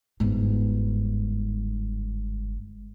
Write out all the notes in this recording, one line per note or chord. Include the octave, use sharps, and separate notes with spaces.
G1 G#2